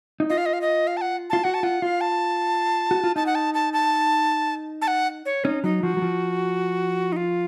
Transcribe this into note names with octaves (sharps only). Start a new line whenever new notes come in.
D#4
F4 D#5
F5
D#5
F5
D#5
F5
A5
F#5
F4 A5
F#4 F#5
A5
F4 F#5
F4 F5
A5
F#4
F4
D#4 A5
F#5
A5
A5
A5
A5
F#5
C#5
C#4 D#4
F#3 D#4
F3 F#4
F#3
F3
D#4
F4